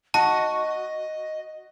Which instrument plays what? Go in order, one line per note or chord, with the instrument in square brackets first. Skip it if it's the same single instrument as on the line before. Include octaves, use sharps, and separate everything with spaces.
[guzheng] F#4 [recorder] D#5 [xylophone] A5